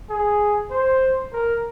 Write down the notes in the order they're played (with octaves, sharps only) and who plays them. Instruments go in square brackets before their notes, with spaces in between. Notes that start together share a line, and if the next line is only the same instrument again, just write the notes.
[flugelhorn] G#4
C5
A#4